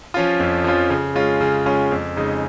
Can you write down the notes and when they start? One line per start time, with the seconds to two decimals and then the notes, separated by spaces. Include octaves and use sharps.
0.14 F3 C#4 F4
0.40 F2
0.64 F3 C#4 F4
0.90 C#3
1.15 G#3 C#4 F4
1.41 C#3
1.66 G#3 C#4 F4
1.91 F2
2.17 C#3 G#3 D#4